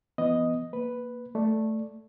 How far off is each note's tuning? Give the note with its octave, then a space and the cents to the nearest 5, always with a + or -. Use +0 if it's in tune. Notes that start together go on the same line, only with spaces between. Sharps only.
E3 +45 B3 +5 D#5 +0
A#3 +0 B4 +0
A3 +0 D5 -5